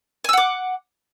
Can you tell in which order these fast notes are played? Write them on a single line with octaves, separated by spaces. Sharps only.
G#5 E6 F#5 D6